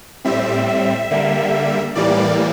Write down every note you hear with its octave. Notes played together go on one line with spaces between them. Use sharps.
A2 G3 C4 E5
E5
D3 G3 A#3
A2 E3 G3 A#3 D5